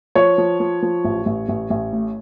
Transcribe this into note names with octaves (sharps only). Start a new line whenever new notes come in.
F3 C#5
F3
F3
F3
A1
A1
A1
A1
A2